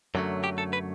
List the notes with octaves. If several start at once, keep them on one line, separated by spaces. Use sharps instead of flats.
F#2 D3 F#3 A3
G4
A4
B4